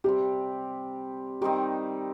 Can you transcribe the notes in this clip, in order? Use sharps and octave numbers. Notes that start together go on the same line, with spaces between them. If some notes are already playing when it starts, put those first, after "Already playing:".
C3 G3 C4 G4
D#3 G3 C4 D#4 G4